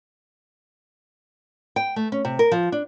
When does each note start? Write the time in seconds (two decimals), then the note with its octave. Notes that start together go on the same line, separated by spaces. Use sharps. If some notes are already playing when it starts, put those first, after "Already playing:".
1.76 G5
1.96 A3
2.12 C#4
2.25 C3
2.39 A#4
2.52 F3
2.72 D4